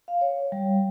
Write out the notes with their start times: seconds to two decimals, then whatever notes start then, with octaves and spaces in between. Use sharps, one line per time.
0.08 F5
0.21 C#5
0.52 G3